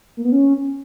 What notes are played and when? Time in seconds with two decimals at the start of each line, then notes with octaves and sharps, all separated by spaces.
0.17 A#3
0.24 B3
0.32 C#4